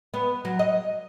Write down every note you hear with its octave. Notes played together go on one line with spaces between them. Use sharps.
B3
F#3
D#5